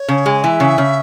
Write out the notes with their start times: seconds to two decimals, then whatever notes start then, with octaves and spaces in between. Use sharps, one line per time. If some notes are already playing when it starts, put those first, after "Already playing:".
Already playing: C#5
0.08 C#3
0.26 G#3
0.44 E3 E5
0.60 C#3
0.78 C#3